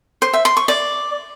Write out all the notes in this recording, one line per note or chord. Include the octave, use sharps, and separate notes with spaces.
C5
E5
C6
C#6
D5